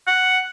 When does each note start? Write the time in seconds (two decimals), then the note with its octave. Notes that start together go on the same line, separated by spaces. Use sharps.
0.07 F#5